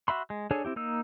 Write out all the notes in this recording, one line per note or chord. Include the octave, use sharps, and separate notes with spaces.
F#4 E5 B5 C6
G#3
D4 G#4 A4 C#5 G#5
C4 E4 G4
A#3 D#4 E6